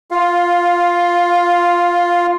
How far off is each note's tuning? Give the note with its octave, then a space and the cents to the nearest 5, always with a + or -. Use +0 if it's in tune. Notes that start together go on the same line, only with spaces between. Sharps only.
F4 +0 F5 +15